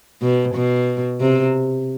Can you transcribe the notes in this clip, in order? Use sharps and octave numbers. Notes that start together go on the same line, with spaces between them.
B2
B2
C3